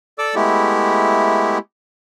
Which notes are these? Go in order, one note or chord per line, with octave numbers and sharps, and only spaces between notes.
A4 D5 D6 E6
G#3 A3 B3 E4 G4